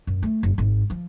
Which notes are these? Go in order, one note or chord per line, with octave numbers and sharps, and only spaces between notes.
F#2
A3
F#1
G#1
F3